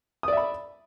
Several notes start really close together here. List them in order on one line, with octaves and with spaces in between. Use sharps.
D#6 D5 E5 B5